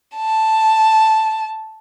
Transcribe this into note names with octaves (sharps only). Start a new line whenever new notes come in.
A5